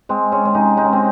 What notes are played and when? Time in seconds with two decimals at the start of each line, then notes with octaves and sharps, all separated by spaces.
0.09 G#3 C4
0.32 G#3 C#4
0.45 C#4
0.55 C3 D#4
0.77 G#3 D#4
0.85 C#4
0.93 C4